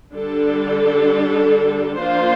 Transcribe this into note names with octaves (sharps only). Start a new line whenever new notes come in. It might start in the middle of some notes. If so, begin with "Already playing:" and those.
D3 G3 D4 A4
F3 A#3 D4 F4 C5